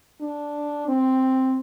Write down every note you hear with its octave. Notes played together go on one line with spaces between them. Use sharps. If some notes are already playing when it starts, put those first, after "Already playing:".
D4
C4